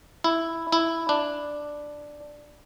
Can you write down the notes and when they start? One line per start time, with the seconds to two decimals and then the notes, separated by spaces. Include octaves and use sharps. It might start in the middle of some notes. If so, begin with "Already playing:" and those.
0.24 E4
0.72 E4
1.09 D4